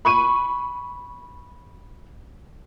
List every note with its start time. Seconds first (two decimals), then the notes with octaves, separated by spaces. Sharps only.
0.05 B5 C#6 D#7